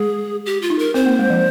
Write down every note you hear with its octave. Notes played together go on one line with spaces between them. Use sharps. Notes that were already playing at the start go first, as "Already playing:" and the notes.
Already playing: G#3 G#4
G4
F4
D#4
A#4
C4 C5
A#3
G#3
F3